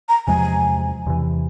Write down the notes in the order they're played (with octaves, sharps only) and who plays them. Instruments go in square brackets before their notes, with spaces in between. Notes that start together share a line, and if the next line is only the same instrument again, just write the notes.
[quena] A#5
[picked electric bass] E2 C3 F3 G#3 [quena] G#5
[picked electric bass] E2 C3 E3